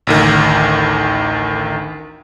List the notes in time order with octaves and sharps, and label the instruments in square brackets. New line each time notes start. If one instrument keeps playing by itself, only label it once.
[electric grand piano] A1 D2 D#3